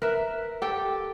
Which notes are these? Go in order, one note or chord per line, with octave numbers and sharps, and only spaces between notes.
A#4 B4 E5
G4 A4 G5